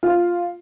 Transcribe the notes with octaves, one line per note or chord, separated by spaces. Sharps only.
F4